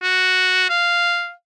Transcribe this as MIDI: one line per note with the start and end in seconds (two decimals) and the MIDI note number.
0.03 0.68 66
0.69 1.31 77